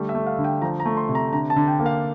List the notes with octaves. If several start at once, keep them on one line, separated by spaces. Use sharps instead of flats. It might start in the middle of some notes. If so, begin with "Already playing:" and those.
Already playing: D3 G3 A3
E5
A3
F5
D3
G5
F3 A#5
A#5
A3
C6
C3
A#5
D3 A#5
A5
D3
G5
A#3
F5